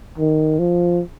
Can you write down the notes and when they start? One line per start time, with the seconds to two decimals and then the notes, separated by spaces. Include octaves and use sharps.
0.18 D#3
0.59 F3